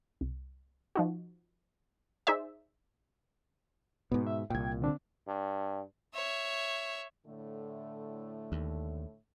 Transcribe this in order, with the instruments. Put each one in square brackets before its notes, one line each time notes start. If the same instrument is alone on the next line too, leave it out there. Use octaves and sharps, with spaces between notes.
[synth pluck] C2
F3 D#4 F#4
D#4 G#4 C5 D5 E5
[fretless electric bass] G#2 B2 [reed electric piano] B3
[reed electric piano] E5
[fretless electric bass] C2 A#2 [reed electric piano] G5 G#6
[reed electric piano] D3 C4 D4
[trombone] G2
[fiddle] C#5 E5
[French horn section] A2 D3 A3
[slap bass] D#2